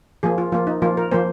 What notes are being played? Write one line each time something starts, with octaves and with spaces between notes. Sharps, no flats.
F3 A#3 G#4
F4
F3 A#3 F4
D#4
F3 A#3 F4
A#4
F3 A#3 C5